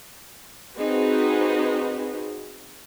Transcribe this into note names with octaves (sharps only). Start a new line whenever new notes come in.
C4 D#4 F#4 G#4 B4